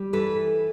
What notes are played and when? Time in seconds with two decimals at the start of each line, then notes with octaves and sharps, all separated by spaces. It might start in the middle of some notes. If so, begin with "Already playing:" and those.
Already playing: G3
0.13 E3 A4 B4